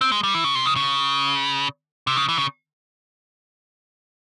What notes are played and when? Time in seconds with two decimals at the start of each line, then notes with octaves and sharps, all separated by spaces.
0.01 C4
0.12 G#3
0.23 G3
0.34 E3
0.44 C#3
0.55 C3
0.66 C#3
0.76 C#3
2.07 C3
2.17 C#3
2.29 E3
2.38 C#3